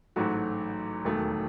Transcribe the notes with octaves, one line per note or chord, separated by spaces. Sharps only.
A1 G#2 F#3 A3 F#4
E1 D#2 D#3 F#3 A3